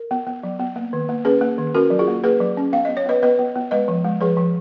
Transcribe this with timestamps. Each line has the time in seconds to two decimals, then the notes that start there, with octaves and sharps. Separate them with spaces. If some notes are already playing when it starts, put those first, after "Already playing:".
Already playing: A#4
0.11 B3
0.27 B3
0.43 F#3
0.59 B3
0.76 A#3
0.93 D#3
1.09 A#3
1.25 C#4 G#4 B4
1.41 A#3
1.58 D#3
1.74 C#4 F#4 A#4
1.90 F#3
1.99 F4 G#4
2.08 A#3
2.23 A#3 G#4 B4
2.40 F#3
2.57 C#4
2.73 B3 F5
2.85 B3 D#5
2.97 C#5
3.06 B3 B4 D#5
3.22 B3 B4 D#5
3.39 B3
3.56 B3
3.71 G#3 B4 D#5
3.88 F3
4.04 G#3
4.21 F3 G#4 B4
4.37 F3